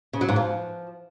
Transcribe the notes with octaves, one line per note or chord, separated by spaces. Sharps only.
C#3
F#3
G#2
F3